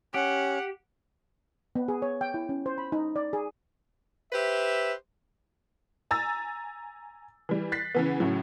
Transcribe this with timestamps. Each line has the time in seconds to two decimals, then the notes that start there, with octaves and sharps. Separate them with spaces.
0.14 C#4 G4 F#5
1.75 B3
1.88 G#4
2.02 C#5
2.21 G5
2.34 E4
2.49 C#4
2.66 C5
2.78 B5
2.92 D#4
3.16 D5
3.33 G#4
4.33 G4 B4 C5 E5
6.11 G#5 A#5 E6 A6
7.49 E3 G3
7.72 F#6 A6 B6 C7
7.95 C#3 E3 B3
8.20 A2 C#3 F#3